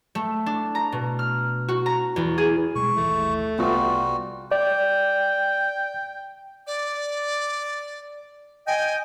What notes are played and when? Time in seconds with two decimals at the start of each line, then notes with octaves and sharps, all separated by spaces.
0.15 A3
0.46 D4
0.75 A#5
0.92 B2
1.19 F6
1.68 F#4
1.86 A#5
2.16 E2
2.38 G#4
2.75 B2 G3 G#3 C#6
2.97 G#1 D#2 E3 A3
3.59 C2 G3 B3 F4 F#4
4.52 D5 G5
6.67 D5
8.67 D#5 G5 G#5